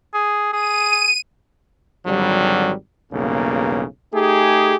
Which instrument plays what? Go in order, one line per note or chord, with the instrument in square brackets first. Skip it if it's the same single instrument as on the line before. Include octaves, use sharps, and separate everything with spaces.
[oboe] G#4
[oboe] G#4 [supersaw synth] D#7
[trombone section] G#1 D3 F#3 G3
B1 E2 G2 C#3 A#3
A3 D#4 G4 G#4